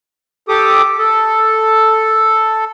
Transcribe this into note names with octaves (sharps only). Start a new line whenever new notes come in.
G4 A4 D6 D#6
A4